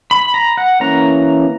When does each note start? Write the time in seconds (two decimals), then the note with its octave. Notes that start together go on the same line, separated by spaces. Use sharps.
0.11 B5
0.34 A#5
0.57 F#5
0.80 E3 A#3 C#4 A#5